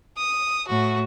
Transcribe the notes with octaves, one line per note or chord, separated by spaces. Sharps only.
D#6
A2 F#4